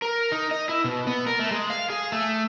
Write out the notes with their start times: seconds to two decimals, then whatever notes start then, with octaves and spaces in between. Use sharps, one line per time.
0.02 A#4
0.32 D#4
0.51 D#5
0.69 E4
0.84 B2
1.07 B3
1.27 A#4
1.39 A3
1.51 G#3
1.70 F5
1.90 G#4
2.12 A3